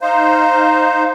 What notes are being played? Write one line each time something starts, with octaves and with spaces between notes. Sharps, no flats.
D#4 C5 F5